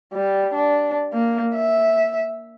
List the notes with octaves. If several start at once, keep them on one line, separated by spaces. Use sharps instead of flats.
G3
D4
A#3
E5